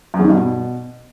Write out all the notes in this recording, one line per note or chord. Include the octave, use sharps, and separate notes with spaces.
F#2
E2
D#3
G2
B2